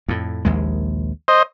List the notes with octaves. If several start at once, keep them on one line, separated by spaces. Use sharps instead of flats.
F2 A2
A#1 D#2 G#3
C5 D#5